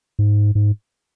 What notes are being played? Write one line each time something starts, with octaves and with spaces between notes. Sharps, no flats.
G#2
G#2